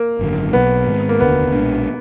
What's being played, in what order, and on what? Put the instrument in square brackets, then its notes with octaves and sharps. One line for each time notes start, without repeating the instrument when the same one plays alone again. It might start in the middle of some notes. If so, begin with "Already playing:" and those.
Already playing: [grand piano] A#3
[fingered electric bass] G#1 F#2 D3
[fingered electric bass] B1 B2 F#3 A#3 [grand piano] B3
[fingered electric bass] G#2 D#3 G#3
[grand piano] A#3
[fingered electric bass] F1 D#2 D3 [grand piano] B3
[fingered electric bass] B1 A#2 G#3 D4